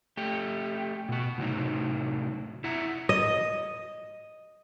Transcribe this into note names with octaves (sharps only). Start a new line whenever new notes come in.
A3 G4
B2 F#4
A2 C3 F#3 D#4
E4 E5 F#5 A#5
D#5